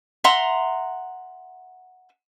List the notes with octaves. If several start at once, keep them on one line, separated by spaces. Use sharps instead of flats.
E5 F#5 A#5 C6